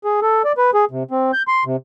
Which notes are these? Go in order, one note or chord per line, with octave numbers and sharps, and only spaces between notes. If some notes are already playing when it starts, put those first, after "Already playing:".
G#4
A4
D5
B4
G#4
C3
C4
G6
C6
C3